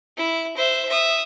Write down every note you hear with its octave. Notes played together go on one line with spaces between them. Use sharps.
E4
C5 E5
E5 D#6